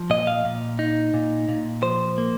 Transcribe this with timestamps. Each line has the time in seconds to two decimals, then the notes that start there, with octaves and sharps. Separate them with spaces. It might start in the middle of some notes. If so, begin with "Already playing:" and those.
Already playing: F3
0.10 A#2 D#5
0.27 F5
0.45 A#2
0.79 D#4
1.14 A#2
1.49 A#2
1.83 F3 C5
2.18 A#3